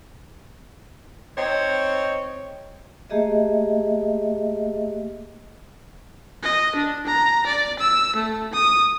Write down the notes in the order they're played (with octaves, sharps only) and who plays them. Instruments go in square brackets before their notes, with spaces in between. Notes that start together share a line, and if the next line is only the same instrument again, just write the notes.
[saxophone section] C4 D#4 C#5
[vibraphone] A3 A#3 G4 G#4 D#5 E5
[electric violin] D#5
D4
A#5
D5
E6
A3
D#6